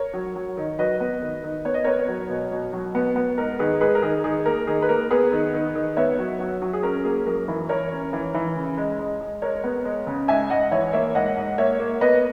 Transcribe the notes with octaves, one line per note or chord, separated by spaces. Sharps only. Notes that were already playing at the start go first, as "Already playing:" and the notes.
Already playing: A#4 C#5
F#3
F#3
D#3
F#3 B4 D#5
B3
D#3
D#3
B3 C#5
D#5
B3 A#4 C#5
F#3
B2
B2
F#3
B3
B3
G#2 A#4
D#3 G#4 B4
G#2 G#4 B4
A#4
D#3 G#4
D#3 G#4
A#3 A#4
D#3 G#4
B4
A#3 A#4
B3 G#4 B4
D#3
D#3
D#3
B3 C#5 E5
F#3
F#3
F#3
G#4
C#4 A#4
A#3 G#4
F#2 A#4
E3
E3 A#4 C#5
C#4
E3
E3
C#3
G#3
G#3
G#3
G#3 A#4 C#5
B3
G#3
C#3
G#2 E5 G#5
G#2 D#5 F#5
E3 C#5 E5
A#3 C#5 E5
G#2 D#5 F#5
G#2
A#3 C#5 E5
A#3
B3 B4 D#5